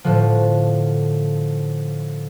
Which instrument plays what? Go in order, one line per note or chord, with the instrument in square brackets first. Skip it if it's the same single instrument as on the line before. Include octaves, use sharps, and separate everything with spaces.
[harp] A2 D3 F3